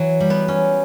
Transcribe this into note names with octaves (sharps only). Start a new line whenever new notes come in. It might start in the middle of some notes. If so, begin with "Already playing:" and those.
Already playing: E3 F#3
G3
B3
G3 C#4